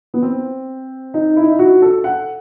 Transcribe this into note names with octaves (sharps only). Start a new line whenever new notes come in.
B3
C4
D#4
E4
D#4
E4
F#4
A4
F#5